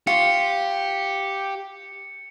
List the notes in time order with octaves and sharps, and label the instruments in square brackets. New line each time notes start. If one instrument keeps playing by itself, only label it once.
[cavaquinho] F4 C#6 [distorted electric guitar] G4 [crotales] C#7